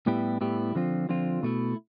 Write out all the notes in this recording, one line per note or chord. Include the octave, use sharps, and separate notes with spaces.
A2 G3 B3 E4 G4
A2 G3 B3 E4 G4
D3 F3 C4 F4
D3 F3 C4 F4
B2 A3 E4